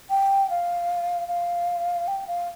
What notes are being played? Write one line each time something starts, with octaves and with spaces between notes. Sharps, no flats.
G5
F5
F5
G5
F5